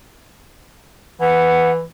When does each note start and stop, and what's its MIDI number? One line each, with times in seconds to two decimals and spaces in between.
1.21 1.83 52
1.21 1.71 78